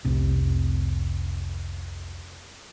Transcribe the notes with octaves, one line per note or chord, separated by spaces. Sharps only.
F1 C2 C3